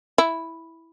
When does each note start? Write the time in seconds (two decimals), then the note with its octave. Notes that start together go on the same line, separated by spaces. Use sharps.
0.18 E4